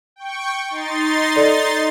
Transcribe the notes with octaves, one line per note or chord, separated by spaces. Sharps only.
G5 C#6
D#4 C6 A6
A4 D5